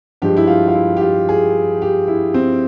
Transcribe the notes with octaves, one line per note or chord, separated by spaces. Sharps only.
G2 F3 G#3 G4
E4
F4
F4
E4
G4
F4
G#4
G4
E4
C4